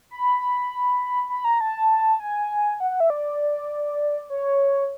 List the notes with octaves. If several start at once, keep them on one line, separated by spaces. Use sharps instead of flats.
B5
B5
A#5
A5
G#5
F#5
F#5
E5
D5
C#5